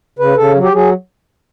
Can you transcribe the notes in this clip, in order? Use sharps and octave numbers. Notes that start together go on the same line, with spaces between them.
C#3 B4
C#3 A4
F#3
G4
F#3 G#4